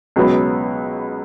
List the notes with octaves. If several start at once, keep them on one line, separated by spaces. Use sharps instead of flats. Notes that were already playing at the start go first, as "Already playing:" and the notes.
C#2 B2 F#3 B3